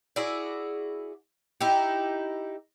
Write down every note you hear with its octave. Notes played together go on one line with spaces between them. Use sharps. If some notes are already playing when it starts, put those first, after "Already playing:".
E4 F#4 G#4 D5
D#4 E4 G4